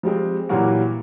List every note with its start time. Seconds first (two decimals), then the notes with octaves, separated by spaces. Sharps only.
0.03 F3 G3 G#3 C4
0.49 A#2 E3 F#3 G3 A#3 F#4